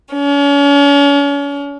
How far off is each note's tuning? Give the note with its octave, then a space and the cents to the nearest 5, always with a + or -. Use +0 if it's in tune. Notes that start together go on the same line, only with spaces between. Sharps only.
C#4 +40